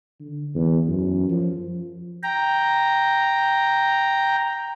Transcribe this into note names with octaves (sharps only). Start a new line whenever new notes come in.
D3
E2
F#2
F3
G5 A#5